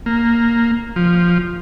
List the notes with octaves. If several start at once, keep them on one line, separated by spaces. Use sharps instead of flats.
A#3
F3